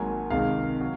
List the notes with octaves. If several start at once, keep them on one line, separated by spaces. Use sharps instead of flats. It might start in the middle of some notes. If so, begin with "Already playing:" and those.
Already playing: G#1 G#2 F#3 A#3 G#5
C#2 C3 D#3 G#3 F5
F#3